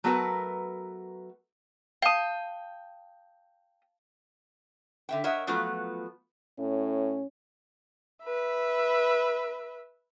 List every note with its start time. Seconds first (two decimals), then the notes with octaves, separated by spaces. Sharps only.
0.04 F#3 A3 B3 F#4 A#4 B4
2.02 F5 G5 A5 D#6
5.09 D3 E5 G5
5.24 A#4 C#5 D#5 E5 F#5
5.47 F3 F#3 A3 B3 F4 F#4
6.59 A2 C#4
8.24 B4 E5